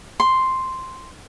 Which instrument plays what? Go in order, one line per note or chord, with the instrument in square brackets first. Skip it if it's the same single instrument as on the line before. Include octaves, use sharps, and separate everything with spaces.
[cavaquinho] C6